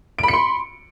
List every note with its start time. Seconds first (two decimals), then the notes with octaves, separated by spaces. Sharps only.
0.19 D7
0.23 B5
0.28 C#7
0.33 C6